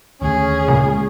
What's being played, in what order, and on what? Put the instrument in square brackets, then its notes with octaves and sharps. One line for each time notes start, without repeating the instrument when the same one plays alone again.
[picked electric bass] D#2 D3 A3 [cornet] C#4 [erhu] G#4
[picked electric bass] D2 G#3 [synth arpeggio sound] A#2 C#3